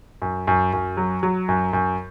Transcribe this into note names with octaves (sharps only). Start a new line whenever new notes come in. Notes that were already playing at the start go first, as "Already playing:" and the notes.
F#2
F#2
F#2
F#3
F#3
F#2
F#2